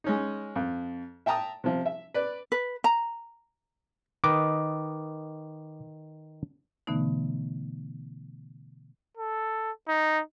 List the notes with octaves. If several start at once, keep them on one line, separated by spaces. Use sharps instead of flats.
G#3 C#4 D#4
F2
E5 G5 A5 A#5 D#6
C3 F3
E5
B4 D5
B4
A#5
D#3 B4 D#5 D6
B2 D3 E3 A3 B3 D#4
A4
D#4